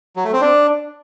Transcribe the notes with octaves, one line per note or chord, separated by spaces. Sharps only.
F#3
A3
C4
D4